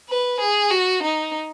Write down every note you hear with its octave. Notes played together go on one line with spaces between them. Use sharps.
B4
G#4
F#4
D#4